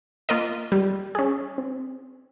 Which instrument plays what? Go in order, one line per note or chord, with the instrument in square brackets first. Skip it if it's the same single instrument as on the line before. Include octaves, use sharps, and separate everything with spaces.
[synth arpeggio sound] A#3 F4 A#4 D#5
G3
C#4 G#4
C4